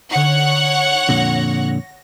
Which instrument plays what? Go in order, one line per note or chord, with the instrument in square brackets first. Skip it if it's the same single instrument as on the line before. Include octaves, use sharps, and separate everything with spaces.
[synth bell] D3 D#4 [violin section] C#5 F#5
[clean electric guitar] F2 A#2 D3 [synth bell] A#6